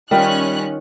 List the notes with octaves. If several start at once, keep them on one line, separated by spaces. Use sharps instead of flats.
D#3 G3 C#4 F4 G4 F#6